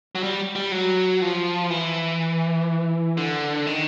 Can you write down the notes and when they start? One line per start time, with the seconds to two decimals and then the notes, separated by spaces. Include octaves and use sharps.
0.15 F#3
0.23 G3
0.55 G3
0.72 F#3
1.22 F3
1.70 E3
3.17 D3
3.66 D#3